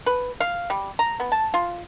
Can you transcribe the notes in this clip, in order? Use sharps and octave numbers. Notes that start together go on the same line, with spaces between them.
B4
F5
G3
A#5
B3
A5
F4